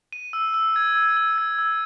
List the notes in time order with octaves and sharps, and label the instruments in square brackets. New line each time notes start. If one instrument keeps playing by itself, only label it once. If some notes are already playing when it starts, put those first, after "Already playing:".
[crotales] D#7
E6
E6
G#6
E6
E6
G#6
E6